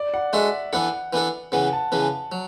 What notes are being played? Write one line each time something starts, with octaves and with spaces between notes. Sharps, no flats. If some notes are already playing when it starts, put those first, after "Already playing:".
Already playing: D5
F#5
G#3 D4 F#4 A4 E5
E3 B3 D4 A4 F#5
E3 B3 D4 A4
C#3 E3 B3 F#5
A5
C#3 E3 B3
F#3